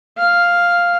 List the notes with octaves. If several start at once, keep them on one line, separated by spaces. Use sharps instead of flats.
F5